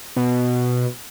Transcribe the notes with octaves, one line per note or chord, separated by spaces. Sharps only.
B2